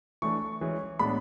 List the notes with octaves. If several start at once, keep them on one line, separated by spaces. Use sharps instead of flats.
E3 A3 D4 C#6
E3 G#3 C#4
A2 G#3 B3 D4 B5